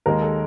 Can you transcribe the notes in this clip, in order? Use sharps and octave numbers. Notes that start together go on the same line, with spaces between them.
D#2 D#3 G#3 A#4
A4